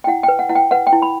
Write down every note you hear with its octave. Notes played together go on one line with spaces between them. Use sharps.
G5
E4 F#5
G5
B4
F#5
E4 F#5
G5
B4 F#5
G5
E4
B5